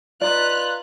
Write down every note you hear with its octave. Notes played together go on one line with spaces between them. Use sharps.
D#4 F4 B4 D5 F#6